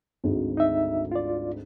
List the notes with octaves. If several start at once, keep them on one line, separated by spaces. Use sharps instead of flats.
G#1 D2 G#2
D#4 E5
F4 D5